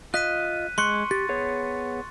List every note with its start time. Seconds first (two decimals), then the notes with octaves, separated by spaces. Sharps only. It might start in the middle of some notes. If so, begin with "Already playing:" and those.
0.14 F4 D#5 F#6 B6 D#7
0.78 G#3 C6 C#6 F#6 C#7
1.11 G4 A6
1.29 B3 G#4 C#5